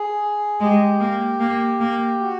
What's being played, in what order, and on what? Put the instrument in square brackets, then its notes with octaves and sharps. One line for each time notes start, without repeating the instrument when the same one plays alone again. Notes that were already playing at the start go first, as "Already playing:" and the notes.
Already playing: [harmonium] G#4
[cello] G#3 [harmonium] G4
[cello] A#3
A#3
A#3
[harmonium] F#4